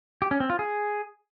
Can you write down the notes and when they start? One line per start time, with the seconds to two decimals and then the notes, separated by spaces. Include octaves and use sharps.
0.22 G4
0.31 C#4
0.40 C4
0.50 F4
0.59 G#4